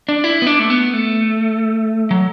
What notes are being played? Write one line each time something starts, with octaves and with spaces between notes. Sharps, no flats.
D4
E4
B3
D4
A3
B3
A3
F#3